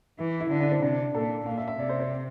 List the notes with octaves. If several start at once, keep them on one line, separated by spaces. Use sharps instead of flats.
E3 E4
E4
D3 D4
D4
C4
C3 D4
A#2 A4
A#2 F5
E5
E5
C3 D5
C5
C5